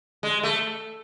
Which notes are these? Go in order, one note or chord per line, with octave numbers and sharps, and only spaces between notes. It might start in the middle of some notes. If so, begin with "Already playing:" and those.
G#3
A3